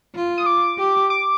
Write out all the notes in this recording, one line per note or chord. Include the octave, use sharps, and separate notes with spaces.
F4
D#6
D6
G4
D6